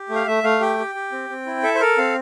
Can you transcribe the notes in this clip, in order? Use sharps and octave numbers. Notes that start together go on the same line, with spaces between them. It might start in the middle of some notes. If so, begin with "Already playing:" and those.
Already playing: G4
A3
F5
A3 E5
A3 F5
G4 G5
G4
G4
C4
C4
E4
A4 E5
C5
A4 A#4
C4 F5